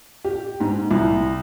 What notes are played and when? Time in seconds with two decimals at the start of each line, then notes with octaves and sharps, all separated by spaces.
0.25 G4
0.60 G#2
0.91 C2